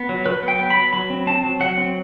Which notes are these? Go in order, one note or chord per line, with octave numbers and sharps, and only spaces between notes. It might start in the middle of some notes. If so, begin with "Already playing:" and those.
Already playing: B3
F#3
F#3 B4
B3
G5
B3
B5
F#3
F#3 B5
C4
C4 A5
F#3
F#3 F#5
C4